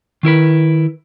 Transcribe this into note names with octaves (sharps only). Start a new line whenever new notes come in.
D#3 E4 A#4 B4